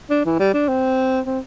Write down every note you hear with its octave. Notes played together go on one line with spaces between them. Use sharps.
D4
E3
G3
D4
C4
C4